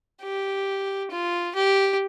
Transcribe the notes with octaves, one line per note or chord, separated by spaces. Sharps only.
G4
F4
G4